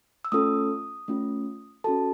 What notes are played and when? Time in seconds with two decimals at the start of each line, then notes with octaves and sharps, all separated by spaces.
0.25 E6
0.32 A3 C#4 F4 A4 D#6
1.08 A3 C#4 F4
1.84 C#4 F#4 A4 A5